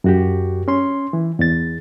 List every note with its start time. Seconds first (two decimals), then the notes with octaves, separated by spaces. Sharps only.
0.04 F#2 F#4 G4
0.68 C#4 C6
1.13 E3
1.39 E2 A6